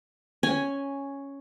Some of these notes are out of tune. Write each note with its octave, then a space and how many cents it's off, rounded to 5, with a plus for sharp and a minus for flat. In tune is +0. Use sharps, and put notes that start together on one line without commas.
C#4 +0 G#5 +0